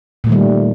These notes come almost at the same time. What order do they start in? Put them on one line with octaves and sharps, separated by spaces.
A#2 A3 D#3 G3